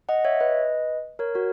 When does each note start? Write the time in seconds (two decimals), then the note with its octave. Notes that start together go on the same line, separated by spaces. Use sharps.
0.09 D#5 F#5
0.25 C#5 E5
0.40 B4 D#5
1.19 A#4 C#5
1.35 F#4 A#4